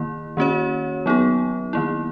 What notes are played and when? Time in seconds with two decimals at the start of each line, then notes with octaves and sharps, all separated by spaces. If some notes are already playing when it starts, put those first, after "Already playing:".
Already playing: D#3 A#3 E4
0.37 D#3 A#3 C#4 F#4 C#5
1.06 F#3 B3 D#4 G#4
1.73 D#3 A#3 E4